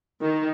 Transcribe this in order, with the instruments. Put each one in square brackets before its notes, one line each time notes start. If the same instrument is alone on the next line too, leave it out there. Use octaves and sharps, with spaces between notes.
[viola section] D#3